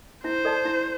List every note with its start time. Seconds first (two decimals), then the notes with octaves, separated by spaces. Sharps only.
0.24 E4 C5
0.45 A4 D5 A5
0.65 E4